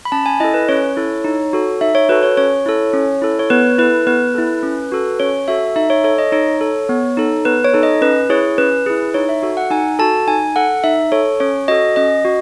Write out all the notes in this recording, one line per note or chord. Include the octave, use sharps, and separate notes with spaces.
B5
C#4 A5
G#5
E4 A4 D#5
B4
C#4 C#5
E4 A4
D#4
F#4 A4
D#4 E5
C#5
F#4 A4 B4
C#5
C#4 C#5
E4 A4
C#4
E4 A4
C#5
B3 B4
E4 A4 B4
B3 B4
E4 A4
C#4
F#4 A4
C#4 C#5
F#4 A4 E5
D#4 E5
C#5
A4 C#5
D#5
D#4 C#5
A4
B3
D#4 A4
B3 B4
C#5
D#4 A4
D#5
C#4 B4
E4 G#4 C#5
C#4 B4
E4 G#4
D#4 C#5
E5
F#4 A4
F#5
D#4 G#5
F#4 A4 A5
D#4 G#5
A4 F#5
D#4 E5
A4 C#5
C#4 C#5
F#4 A4 D#5
C#4 D#5
F#4